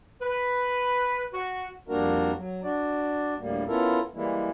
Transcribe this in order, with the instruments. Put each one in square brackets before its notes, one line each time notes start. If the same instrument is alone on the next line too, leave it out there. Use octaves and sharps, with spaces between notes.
[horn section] B4
F#4
[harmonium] F2 G3 A#3 D4 F#4 A#4
F#3
D4 F#4 D5
D2 A2 G3 A#3
B3 C#4 E4 F4 A4 A#4
E3 G3 G#3 A#3 E4